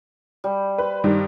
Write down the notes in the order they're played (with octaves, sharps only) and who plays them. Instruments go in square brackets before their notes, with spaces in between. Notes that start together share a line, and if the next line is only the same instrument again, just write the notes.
[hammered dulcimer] G3
[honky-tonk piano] B4 [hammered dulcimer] C5
[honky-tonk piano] G2 D#3 G3 [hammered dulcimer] D#4